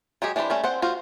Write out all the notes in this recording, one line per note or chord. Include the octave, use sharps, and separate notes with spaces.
F#3 G#3 G4 G#4
E3 D4 G4 C5 B5
G3 A3 C#4
C4 C5 F#5
F4 F#4 C5